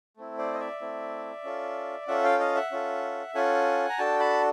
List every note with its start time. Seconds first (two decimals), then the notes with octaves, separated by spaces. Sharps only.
0.17 A3 C4 E4
0.38 C5 D5
0.53 D#5
0.59 D5 E5
0.81 A3 C4 E4
1.44 C#4 F4 A4
2.08 C#4 F4 A4 E5 F#5
2.24 F5 G5
2.40 D#5 F5
2.55 E5 F#5
2.72 C#4 F4 A4
3.35 C#4 F4 A4 F#5 G#5
3.89 A#5
3.98 D4 F#4 A4 G5 A5
4.20 A5 B5